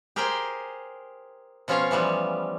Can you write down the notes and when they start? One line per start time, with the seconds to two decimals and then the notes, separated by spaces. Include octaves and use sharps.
0.16 G4 G#4 A#4 C5 G5 G#5
1.68 B2 F3 C#4 F4 C#5 F5
1.91 E3 F3 G3 B3